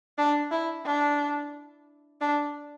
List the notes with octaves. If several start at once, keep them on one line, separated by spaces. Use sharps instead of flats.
D4
E4
D4
D4